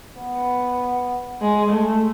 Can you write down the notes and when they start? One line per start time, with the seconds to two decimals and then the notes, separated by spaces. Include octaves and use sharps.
0.20 B3
1.41 G#3
1.72 A3